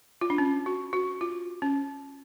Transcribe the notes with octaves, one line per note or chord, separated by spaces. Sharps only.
F4
D4
C#4
F#4
F#4
F4
C#4